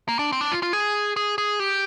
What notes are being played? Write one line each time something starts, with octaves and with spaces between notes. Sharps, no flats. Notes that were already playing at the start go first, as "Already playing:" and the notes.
A#3
D4
C4
D4
F4
F4
G#4
G#4
G#4
G4